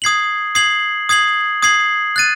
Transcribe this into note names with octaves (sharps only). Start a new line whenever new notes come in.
D#6 G#6 C7 F#7
D#6 G#6 C7 F#7
D#6 G#6 C7 F#7
D#6 G#6 C7 F#7
F#6 A6 D#7